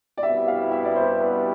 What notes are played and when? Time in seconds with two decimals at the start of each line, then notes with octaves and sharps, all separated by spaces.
0.17 D5
0.23 C2 B2 G3 B3 E4 E5
0.48 F5
0.72 E5
0.85 D5
0.96 C5
1.20 B4